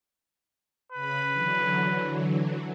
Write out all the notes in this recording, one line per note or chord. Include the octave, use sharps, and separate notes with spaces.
C#3 B4 B5
D3 E3 F#3